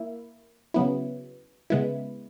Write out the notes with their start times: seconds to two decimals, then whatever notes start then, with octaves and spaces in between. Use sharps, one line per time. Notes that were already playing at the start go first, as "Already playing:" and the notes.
Already playing: A#3 E4
0.74 C#3 F#3 B3 E4
1.70 C#3 G#3 B3 E4